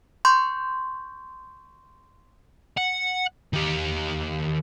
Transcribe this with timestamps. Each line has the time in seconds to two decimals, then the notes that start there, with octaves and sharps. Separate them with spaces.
0.25 C6 C#6 G6
2.77 F#5
3.53 D#3 G4